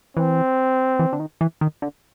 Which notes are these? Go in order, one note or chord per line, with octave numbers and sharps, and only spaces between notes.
E3 C4
E3
D3
D#3
E3
D#3
D3